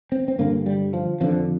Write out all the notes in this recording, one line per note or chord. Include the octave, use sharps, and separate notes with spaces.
C4
C4
G2 D3 A#3
G3
F3
F2 D3 F3